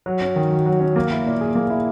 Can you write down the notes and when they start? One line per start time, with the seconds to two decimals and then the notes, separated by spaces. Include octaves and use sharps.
0.06 F#3
0.21 C#4
0.36 D#3
0.51 F#4
0.66 F#3
0.81 C#4
0.96 A#3
1.11 E4
1.26 A#2
1.41 G#4
1.55 A#3
1.70 E4